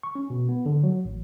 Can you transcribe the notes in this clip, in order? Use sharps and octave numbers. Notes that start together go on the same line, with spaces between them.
C#6
C#4
B2
B3
D3
F#3
A1